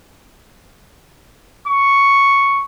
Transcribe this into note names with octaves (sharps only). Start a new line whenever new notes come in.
C#6